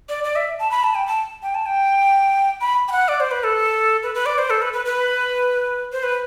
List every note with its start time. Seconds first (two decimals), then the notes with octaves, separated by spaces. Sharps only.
0.09 D5
0.24 D5
0.36 E5
0.60 A5
0.71 B5
0.84 A5
0.95 G5
1.07 A5
1.43 G5
1.55 A5
1.66 G5
2.61 B5
2.88 G5
2.92 F#5
3.08 D5
3.20 C5
3.31 B4
3.44 A4
4.03 B4
4.15 B4
4.26 D5
4.38 C5
4.50 A4
4.62 B4
4.73 B4
4.85 B4
5.93 C5
6.03 B4